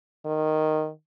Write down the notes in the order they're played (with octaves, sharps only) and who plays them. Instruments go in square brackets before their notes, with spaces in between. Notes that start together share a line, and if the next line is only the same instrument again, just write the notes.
[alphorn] D#3